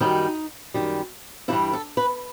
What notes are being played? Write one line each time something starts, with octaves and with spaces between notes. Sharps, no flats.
F#2 D#3 G3 D#4
F#2 D#3 G3
G2 E3 G3 E4
A4
B4